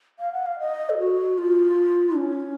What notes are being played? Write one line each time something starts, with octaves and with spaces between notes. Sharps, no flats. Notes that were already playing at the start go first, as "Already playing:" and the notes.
F5
F#5
F5
D#5
A4
F#4
F4
C#4